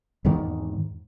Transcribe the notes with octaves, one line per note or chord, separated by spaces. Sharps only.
E2 G#2 D#3 G#3